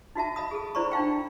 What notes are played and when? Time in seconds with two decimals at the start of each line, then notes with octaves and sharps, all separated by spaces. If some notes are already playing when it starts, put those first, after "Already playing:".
0.15 D#4 F#4 E5 A5
0.36 D#5 F5 B5 D#6
0.51 G#4 A4
0.75 E4 C5 D5 B5 C#6
0.91 D4 D#4 F5 G5